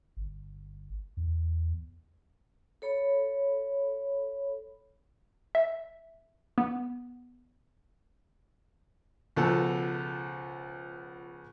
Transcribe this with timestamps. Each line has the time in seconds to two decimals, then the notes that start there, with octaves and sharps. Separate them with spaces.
0.17 G1
1.17 E2
2.82 A4 C#5 B5
5.55 E5
6.58 B3
9.36 C#2 B2 F3 A4 F#5